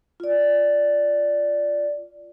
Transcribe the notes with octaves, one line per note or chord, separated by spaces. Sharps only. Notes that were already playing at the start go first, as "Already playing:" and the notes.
F4 D5